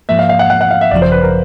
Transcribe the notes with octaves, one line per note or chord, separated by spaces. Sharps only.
G#2 F3 A#3 E5
F5
F5
F#5
F#5
F#5
F5
E5
G#1 F#2 C#3 F3 D5
C5
B4
A#4